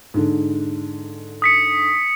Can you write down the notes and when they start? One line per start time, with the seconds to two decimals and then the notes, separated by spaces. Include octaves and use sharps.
0.14 G#2 D3
1.42 D#6 B6 C#7